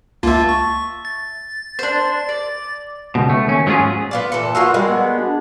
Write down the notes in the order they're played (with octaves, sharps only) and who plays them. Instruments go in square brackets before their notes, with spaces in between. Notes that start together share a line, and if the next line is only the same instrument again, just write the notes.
[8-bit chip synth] C#2 A#3 F4 [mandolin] E5 A5
[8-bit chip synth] C#6
A6
[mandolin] D4 C5
D5
[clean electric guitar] C#2 B2
A3
D#2 C#4
G#2 F#3 C#4 D4 F4 G#4
[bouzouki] B3 F4 D5
[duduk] A#2 [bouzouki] E3 A4 [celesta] C#7
[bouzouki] A#3 B3 F4 [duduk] F#4 [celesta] E6
[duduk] G3 [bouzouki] G#3 [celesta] A#4
[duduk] B3
[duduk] D4 [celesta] F#4